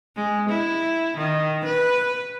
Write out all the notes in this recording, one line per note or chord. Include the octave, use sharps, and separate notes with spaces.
G#3
E4
D#3
B4